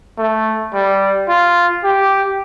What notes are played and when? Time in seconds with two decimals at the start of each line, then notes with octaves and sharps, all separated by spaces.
0.18 A3
0.74 G3
1.29 F4
1.84 G4